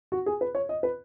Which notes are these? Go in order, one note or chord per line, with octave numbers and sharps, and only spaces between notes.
F#4
G#4
B4
C#5
D#5
B4